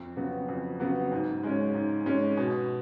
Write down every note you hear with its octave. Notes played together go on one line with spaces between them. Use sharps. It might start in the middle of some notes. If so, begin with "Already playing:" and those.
Already playing: F2
C#3 F#3 B3 F#4
F2
C#3 F#3 B3 F#4
G#2
G#3 C#4
G#2
G#3 C#4
B2